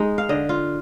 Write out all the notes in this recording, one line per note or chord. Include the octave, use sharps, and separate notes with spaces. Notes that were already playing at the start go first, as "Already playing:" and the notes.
Already playing: G#3 D#4
F5
D3 D#5
F4